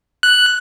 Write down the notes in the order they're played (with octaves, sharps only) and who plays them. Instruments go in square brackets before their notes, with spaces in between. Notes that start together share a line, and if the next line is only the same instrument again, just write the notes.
[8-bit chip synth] F#6